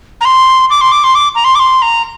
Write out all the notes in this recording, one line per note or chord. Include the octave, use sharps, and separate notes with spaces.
A#5
C6
D6
C6
D6
C6
D6
A#5
C6
D6
C6
A#5